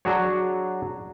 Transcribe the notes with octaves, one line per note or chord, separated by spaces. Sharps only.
F#3 D4 F#4 G#4 C#5